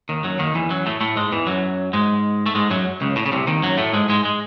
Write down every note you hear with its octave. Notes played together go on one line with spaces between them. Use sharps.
D#2 D#3
F#2 F#3
D#2 D#3
E2 E3
F#2 F#3
A2 A3
A2 A3
G#2 G#3
E2 E3
F#2 F#3
G#2 G#3
A3
G#2 G#3
F#2 F#3
C#2 C#3
A2
C#3
C2 C3
D#2 D#3
F#2 F#3
A2 A3
G#2 G#3
G#2 G#3
G#3